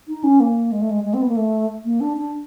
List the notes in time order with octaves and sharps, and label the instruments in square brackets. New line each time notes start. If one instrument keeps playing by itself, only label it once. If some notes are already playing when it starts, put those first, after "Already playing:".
[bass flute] D#4
C#4
A#3
G#3
A3
G#3
G#3
C4
B3
A#3
A3
A#3
D4
D4